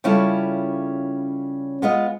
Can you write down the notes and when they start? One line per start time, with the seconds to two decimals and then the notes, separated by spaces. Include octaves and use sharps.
0.04 C#3 G3 C#4 E4 F4 A4
1.82 G#3 B3 F4 D#5